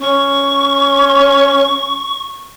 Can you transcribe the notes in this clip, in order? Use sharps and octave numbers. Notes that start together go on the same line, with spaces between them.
C#4 C#6